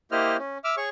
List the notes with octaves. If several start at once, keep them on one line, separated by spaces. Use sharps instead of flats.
A#3 E4 G4 C5 D#5 F6
C#4
E5 D6 E6 F6
G#4 C#5 C#6